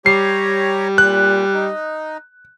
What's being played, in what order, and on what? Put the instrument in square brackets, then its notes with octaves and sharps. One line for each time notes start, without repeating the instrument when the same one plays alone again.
[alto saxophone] G3 [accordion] G4 C#5 A#5 [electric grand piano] C7
[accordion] A#2 [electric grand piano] F#6
[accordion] D#4